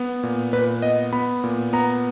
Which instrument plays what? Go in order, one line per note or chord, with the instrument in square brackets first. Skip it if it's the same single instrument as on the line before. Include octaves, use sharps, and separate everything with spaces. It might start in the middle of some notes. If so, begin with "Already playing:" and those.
Already playing: [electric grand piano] B3
A#2
A#2 B4
B3 D#5
B3 B5
A#2
B3 A#5